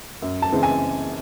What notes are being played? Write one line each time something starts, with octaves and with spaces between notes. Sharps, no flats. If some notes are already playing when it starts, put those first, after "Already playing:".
F#2
A5
C#3 E3 G#3 C4
G#5